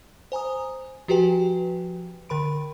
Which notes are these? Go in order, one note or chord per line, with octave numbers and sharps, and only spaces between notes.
C5 G#5 A#5 D#6
F3 F#4 G4 B4 G5 G#5
D3 A#4 B5 D7